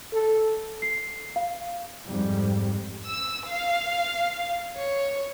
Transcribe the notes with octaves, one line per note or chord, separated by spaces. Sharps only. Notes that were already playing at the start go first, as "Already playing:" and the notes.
A4
C7
F5
F2 G#2 G3
E6
F5
C#5